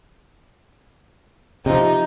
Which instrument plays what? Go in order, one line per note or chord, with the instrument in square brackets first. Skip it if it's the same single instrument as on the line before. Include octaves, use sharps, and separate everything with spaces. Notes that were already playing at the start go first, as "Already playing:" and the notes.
[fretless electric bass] C3 F3 [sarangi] D#4